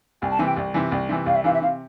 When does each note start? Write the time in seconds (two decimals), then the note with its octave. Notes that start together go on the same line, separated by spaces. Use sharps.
0.22 C2 G#5
0.31 A5
0.39 C3 E3 G#5
0.47 G5
0.57 C2
0.74 C3 E3
0.92 C2
1.09 C3 E3
1.26 C2 F5
1.35 E5
1.44 C3 E3 F5
1.53 E5
1.62 C3 F5